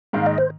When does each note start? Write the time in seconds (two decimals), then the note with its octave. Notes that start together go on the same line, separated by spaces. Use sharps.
0.13 G#2 D#3 A#3 F5
0.26 D#5
0.38 C5